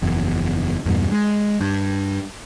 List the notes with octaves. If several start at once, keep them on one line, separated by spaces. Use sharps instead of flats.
F#1 E2
E2 G2 B2
G#3
G2